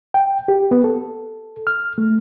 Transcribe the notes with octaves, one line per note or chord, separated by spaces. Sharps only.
G5
G4
B3
A4
F6
A3